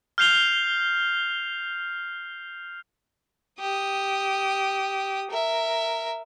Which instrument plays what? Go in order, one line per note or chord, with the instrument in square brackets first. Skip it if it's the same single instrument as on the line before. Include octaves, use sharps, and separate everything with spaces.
[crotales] F6 G6 C7 F7 G7
[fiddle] G4 D#6
A#4 E5